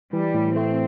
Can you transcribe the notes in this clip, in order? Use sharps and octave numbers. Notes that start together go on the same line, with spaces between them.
E3 G3
A2
A3 C4